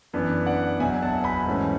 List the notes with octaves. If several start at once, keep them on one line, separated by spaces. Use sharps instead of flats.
F#2 E3 B3 D4
D5 F#5
E2 B2 F#3 E5 G#5
F#5 A5
G#5 B5
G#2 E3 A3 C#4